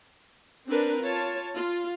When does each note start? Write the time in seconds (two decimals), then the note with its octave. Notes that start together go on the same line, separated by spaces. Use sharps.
0.68 C4 D4 A#4 B4
1.01 F4 C#5 A5
1.54 F4